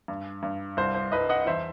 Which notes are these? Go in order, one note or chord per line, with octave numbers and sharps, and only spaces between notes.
G2
G2
C2 C5
C5
C2 B4 D#5
D#5 F#5
E2 C5 E5